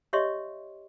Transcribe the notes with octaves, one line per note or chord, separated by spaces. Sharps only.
G4 C#5 D#5 E5 C6 C#6